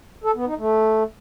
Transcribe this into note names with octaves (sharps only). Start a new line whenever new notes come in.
A4
B3
D#4
A3